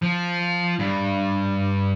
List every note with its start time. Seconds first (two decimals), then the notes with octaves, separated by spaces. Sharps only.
0.02 F3
0.79 G2